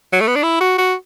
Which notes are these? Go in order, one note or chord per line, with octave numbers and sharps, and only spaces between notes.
F#3
A3
B3
D4
E4
F#4
F#4